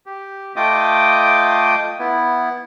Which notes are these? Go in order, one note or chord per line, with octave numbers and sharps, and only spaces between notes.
G4
A3 F4 D#5 G5 D6 D#6
B3 E4